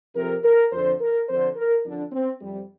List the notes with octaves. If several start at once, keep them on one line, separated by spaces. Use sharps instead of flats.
F2 C3 A#4
A#4
F2 D3 C5
A#4
F2 D3 C5
A#4
F2 D3 D4
C4
F2 C3 G3